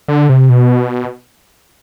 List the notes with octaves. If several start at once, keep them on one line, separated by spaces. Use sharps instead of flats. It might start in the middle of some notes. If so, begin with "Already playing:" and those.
D3
C3
B2